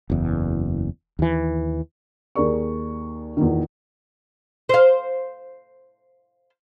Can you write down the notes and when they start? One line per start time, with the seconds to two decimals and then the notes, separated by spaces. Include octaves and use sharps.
0.10 F#1 E2
1.19 D#2 E3
2.35 D#2 G#4 A#4 D5 C#6
3.37 E2 A#2 D#3
4.69 C5 F5